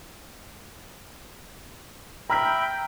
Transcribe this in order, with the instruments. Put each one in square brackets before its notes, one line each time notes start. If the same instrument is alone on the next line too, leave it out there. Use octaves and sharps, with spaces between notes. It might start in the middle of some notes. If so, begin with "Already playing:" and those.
[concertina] E5 B5 [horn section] G5 [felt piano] A#5 F6 B6